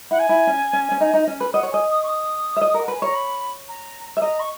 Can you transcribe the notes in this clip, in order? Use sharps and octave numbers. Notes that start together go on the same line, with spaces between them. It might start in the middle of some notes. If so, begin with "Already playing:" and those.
E4 F#5
G#5
E4
C#4
C#4
C#4
D#4
D#4
C#4
B4
D#5 F#5
C#5
D#5 G#5
D#6
C#6
D#6
E5
D#5
A#4
F#5
B4 G#5
C#5 A#5
B5
A#5
E5
D#5 A#5
C#6